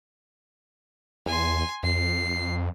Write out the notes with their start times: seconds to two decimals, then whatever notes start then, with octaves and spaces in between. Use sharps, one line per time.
1.26 E2 G#5 C6
1.83 F2 C7